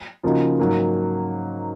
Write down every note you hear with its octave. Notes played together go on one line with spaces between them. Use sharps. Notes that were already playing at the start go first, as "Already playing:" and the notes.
C#3 F3 A#3 D#4 F#4
G#2 F#3 A#3